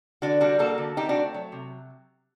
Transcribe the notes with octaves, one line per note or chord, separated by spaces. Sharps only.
D3 D4 F#4
G3 D4 F#4
A#3 F#4 A4
D3
C4 D#4 G4
D4 F#4
A3
F#3
C3